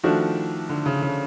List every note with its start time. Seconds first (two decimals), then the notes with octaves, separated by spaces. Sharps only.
0.04 D#3 F3 A3 D4 F#4
0.69 D3
0.86 C#3
1.03 C#3